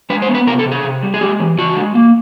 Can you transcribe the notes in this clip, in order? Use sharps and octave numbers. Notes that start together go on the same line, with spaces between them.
G#3 B4
C5
B3
B4
C3 A#4
A4
C3
G#4
C3
G3
G#4
G#3 G4
E3
C#3 F#4
G#3
A#3